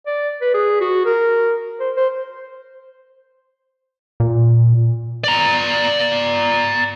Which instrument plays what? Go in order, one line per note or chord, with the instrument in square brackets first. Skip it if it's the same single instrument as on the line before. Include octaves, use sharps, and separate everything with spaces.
[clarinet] D5
B4
G#4
F#4
A#4
C5
C5
[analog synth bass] A#2
[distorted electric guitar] D5 A#5